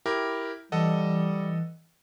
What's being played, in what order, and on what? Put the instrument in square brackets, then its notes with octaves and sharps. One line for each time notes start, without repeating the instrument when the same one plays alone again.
[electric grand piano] E4 G4 A#4
[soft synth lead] E3 [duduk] G3 [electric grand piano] A4 D#5 F#5